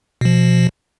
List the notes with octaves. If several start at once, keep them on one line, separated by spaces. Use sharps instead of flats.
B2 F3